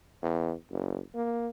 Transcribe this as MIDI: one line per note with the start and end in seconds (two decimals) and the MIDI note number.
0.22 0.53 40
0.71 0.99 30
1.15 1.48 58